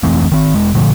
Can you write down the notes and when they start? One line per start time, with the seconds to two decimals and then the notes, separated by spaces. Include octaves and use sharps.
0.03 F2 E3 A3 C4
0.32 D#3 C4
0.55 E1 G#3
0.75 A#2 D3 F3 A3